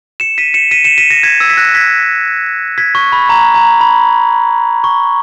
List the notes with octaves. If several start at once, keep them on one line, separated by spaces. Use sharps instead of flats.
C#7 E7
B6 D#7
C#7 E7
B6 D#7
C#7 E7
B6 D#7
A#6 C#7
G#6 B6
E6 G#6
B6
F#6 A#6
G#6 B6
G#6 B6
C#6
B5
A#5
A#5
B5
C#6